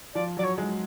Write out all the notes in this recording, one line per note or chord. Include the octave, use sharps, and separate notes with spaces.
F3 D5
F#3 D5
C#5
G#3